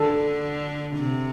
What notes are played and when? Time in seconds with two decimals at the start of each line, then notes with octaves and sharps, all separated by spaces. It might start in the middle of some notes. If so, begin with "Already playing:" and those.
Already playing: D3 A4
0.96 C3